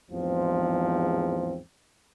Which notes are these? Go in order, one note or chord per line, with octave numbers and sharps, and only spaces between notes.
A1 E2 G#2 F3 C4